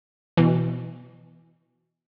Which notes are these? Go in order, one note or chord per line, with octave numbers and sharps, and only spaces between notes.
B2 E3